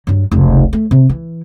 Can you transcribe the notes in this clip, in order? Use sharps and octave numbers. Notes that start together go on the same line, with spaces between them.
G2 F#3
F1 C#2
A3
C3
E3